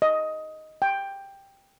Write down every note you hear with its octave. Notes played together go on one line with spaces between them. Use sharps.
D#5
G5